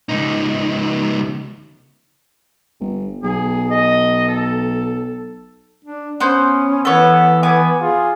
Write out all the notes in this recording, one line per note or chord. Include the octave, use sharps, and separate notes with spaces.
C#2 D#4
G1
B1 G#4
D#5
A4
D4
B3 C#4 C5 G6
E3 B3 A4 C#5
B3 G#5 D6
F4 G#4